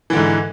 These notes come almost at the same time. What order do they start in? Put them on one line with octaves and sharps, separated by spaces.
E3 D3 G#2